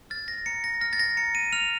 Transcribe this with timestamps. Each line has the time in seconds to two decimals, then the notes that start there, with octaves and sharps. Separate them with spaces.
0.10 F6 A6
0.28 A#6
0.46 A#5 C#7
0.64 A#6
0.81 F6 A#6
0.93 A6
0.99 A#6
1.17 A#5 C#7
1.35 D#7
1.52 F6 F7